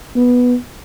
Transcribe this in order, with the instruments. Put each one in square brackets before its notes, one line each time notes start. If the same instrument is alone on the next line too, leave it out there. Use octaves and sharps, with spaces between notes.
[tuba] B3